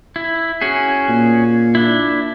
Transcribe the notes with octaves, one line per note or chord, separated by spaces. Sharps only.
E4
C#4 F#4 G#4
A#2
D4 E4